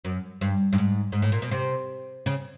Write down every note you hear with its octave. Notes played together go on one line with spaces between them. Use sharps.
F#2
G2
G2
G#2
G#2
A2
A#2
B2
C3
C#3